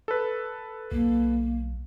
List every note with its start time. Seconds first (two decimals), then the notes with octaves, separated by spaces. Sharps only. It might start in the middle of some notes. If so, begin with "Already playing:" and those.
0.08 A4 B4
0.92 B1 A#3